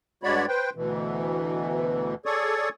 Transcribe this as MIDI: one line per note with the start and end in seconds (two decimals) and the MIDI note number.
0.23 0.46 43
0.23 0.46 56
0.23 0.46 66
0.23 0.46 73
0.23 0.46 74
0.23 0.46 83
0.48 0.70 71
0.48 0.70 72
0.48 0.70 79
0.75 2.15 38
0.75 2.15 47
0.75 2.15 52
2.26 2.69 68
2.26 2.69 69
2.26 2.69 73
2.26 2.69 74
2.26 2.69 85
2.26 2.69 87